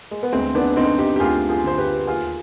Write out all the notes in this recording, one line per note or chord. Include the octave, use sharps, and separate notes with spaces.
G#3
B3
D2 G#3 C4
B3 D4
D3 C4 D#4
D#4 G4
G4
D2 F4 G#4
F4 G#4
D3 C5
G4 B4
D#2 F4 G#4